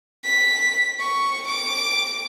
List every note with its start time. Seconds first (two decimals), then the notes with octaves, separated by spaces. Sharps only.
0.24 B6
0.99 C#6
1.48 D6